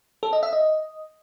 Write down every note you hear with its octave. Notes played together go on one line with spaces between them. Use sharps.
A4
D#5
E5
D#5